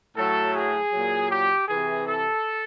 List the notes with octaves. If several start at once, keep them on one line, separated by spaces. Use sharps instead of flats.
A2 F#3 A4
G#4
A#2 F#3
G4
C3 E3 G#4
A4